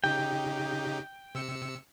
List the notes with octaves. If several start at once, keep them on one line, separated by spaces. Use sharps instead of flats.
C#3 D#4 G4 G5
C3 E6 C#7